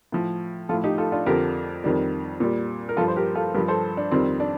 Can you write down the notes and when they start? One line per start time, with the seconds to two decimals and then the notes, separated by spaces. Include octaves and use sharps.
0.12 A2 F3
0.69 F3 F4 A4
0.74 A2
0.84 D#4 G4
0.98 F4 A4
1.12 D4 F4
1.26 F2 D3 F3 G4 A#4
1.84 F2 D#3 G3
2.40 A#2 G3
2.89 A#4
2.97 G2 F3 F4 A4
3.08 C5
3.16 G4 A#4
3.35 F4 A4
3.54 G2 F3 G4 A#4
3.68 A4 C5
3.97 D4
4.11 F2 D#3 G3 C4
4.40 D4